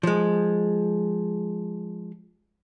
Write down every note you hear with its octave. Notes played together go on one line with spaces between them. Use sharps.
F3 G#3